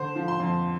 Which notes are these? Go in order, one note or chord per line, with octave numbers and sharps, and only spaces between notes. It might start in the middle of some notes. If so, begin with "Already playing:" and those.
Already playing: D3 C5
F3
C6
F2